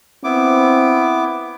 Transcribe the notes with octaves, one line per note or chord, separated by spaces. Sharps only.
B3 C4 E4 D6